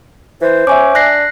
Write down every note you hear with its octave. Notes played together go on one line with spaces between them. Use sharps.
E3 C5
C#4 E5 G#5 D6
D4 F#6 A#6 C7